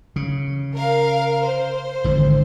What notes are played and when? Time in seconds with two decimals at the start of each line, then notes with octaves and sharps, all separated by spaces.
0.16 C#3
0.75 A#4 F5
1.46 C5
2.04 G#1 D3 E3